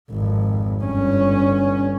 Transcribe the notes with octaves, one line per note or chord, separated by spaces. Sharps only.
G#1 F2
G1 C#4